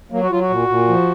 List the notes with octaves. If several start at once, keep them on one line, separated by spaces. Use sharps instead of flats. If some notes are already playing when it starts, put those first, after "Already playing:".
F#3 A#3
F#4
F#3 F4
F#4
A#2
A#2
F3